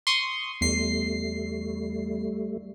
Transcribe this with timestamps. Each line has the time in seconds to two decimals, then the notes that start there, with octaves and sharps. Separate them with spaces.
0.07 C6 C#6 D#6
0.61 E2 G3 A3 C7